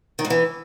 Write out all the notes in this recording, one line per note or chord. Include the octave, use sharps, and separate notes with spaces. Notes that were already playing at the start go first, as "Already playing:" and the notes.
D#3
G#2
E3